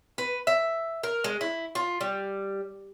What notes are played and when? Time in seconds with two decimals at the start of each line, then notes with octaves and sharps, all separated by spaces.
0.18 B4
0.47 E5
1.03 A#4
1.24 G#3
1.41 E4
1.75 F4
2.01 G3